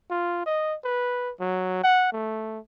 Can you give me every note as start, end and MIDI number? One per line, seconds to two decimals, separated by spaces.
0.10 0.45 65
0.46 0.75 75
0.84 1.32 71
1.40 1.80 54
1.83 2.10 78
2.12 2.59 57